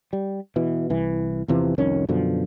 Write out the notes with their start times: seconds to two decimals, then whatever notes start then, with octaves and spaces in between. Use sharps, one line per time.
0.13 G3
0.56 B2 E3
0.90 C2 E3
1.48 E2 C3 E3 F3
1.78 C2 F2 D#3 C#4
2.09 F#2 B2 D3 F3